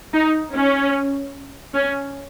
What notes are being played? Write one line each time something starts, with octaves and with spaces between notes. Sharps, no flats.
D#4
C#4
C#4